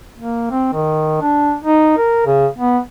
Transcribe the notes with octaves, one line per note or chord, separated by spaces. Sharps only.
A#3
C4
D#3
D4
D#4
A#4
C#3
B3